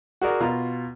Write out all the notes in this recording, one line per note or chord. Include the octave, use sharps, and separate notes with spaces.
F#4 G#4 A#4 D5
B2 F4 A#5